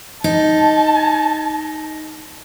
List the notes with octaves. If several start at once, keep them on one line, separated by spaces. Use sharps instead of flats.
D#4 A5